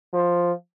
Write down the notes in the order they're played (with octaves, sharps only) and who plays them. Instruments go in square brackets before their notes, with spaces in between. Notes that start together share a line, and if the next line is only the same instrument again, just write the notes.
[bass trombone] F3